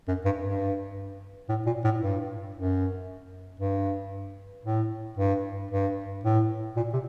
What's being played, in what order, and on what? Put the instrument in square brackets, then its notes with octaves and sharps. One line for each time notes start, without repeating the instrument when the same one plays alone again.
[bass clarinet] F#2
G2
G2
A2
A#2
A2
G2
F#2
G2
A2
G2
G2
A2
A#2
C3